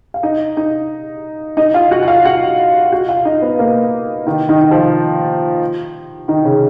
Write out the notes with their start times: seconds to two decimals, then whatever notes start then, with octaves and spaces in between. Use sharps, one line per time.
0.14 F5
0.23 D#4 D#5
0.57 D#4 D#5
1.57 D#4 D#5
1.74 F4 F5
1.91 F#4 F#5
2.03 F#5
2.08 F4 F5
2.25 F#4 F#5
2.93 F#4 F#5
3.08 F4 F5
3.25 D#4 D#5
3.42 B3 B4
3.59 A#3 A#4
4.26 D#3 D#4
4.49 D#3 D#4
4.61 D#4
4.71 F3 F4
6.28 D#3 D#4
6.45 C#3 C#4